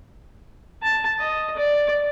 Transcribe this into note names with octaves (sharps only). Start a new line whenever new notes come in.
A5
D#5
D5